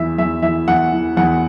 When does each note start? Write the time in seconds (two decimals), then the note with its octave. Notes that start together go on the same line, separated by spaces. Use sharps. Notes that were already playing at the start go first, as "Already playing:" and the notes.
Already playing: E2 E3 E5
0.18 E2 E5
0.42 E3 E5
0.68 E2 F#5
0.92 E3
1.17 E2 F#5